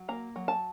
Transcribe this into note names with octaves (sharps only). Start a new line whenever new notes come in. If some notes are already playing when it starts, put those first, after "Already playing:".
Already playing: F#3
A#3 A#5
F#3
A5